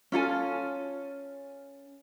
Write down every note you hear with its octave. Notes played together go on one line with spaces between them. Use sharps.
C#4 F4 A4 G#5